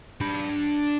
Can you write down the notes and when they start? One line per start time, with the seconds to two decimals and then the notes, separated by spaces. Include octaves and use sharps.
0.21 D4 B5